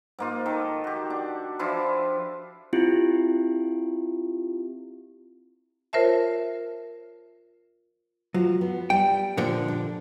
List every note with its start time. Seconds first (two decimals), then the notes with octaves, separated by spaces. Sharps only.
0.19 G#2 A#3 F4
0.46 D#3 A4
0.84 F#4 G4
1.10 D4
1.59 F3 D4 E4 F4
2.73 C4 E4 F4 G4
5.93 F4 A#4 C5 C#5 E5 A5
8.34 F3 F#3
8.61 B3
8.90 G3 G5
9.37 A#2 D3 F3
9.68 D4